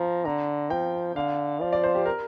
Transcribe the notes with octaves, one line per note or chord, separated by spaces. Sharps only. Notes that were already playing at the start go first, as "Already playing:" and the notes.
Already playing: F3 A#5
D3 A#5
F3 G5
D3 F5
F3 D5
D5
C5
G4
A#4